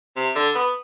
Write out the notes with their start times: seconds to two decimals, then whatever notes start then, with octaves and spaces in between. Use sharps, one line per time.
0.17 C3
0.35 D3
0.55 B3